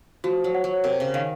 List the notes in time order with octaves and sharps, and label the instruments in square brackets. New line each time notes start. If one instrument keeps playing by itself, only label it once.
[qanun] F3 [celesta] F#4
[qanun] F#3
[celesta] F#5
[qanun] F#3
[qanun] C3 [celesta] A#4
[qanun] C#3
[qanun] D#3 [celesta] F5